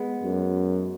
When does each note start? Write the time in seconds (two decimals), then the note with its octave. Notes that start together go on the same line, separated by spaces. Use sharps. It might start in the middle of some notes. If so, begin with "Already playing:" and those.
Already playing: G#3 B3
0.24 F#2